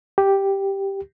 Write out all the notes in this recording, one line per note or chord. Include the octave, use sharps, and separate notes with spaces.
G4